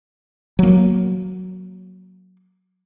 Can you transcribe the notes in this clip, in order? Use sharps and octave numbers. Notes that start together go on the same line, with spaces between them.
F#3 A#3